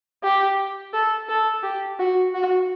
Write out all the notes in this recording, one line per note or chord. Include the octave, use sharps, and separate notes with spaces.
G4
A4
A4
G4
F#4
F#4